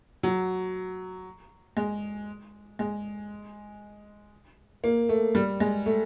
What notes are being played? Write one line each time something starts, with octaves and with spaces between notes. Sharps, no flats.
F#3
G#3
G#3
A#3
A3
G3
G#3
A3